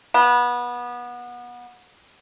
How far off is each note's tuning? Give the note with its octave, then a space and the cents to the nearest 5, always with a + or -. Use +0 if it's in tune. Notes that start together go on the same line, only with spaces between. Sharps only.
B3 -25